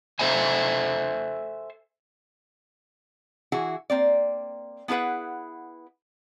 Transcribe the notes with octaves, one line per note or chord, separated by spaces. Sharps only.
A4 C5 E5 G#5
E3 E4 F#4 G#4
A#3 C4 D5
B3 E4 G#4 B4 F#5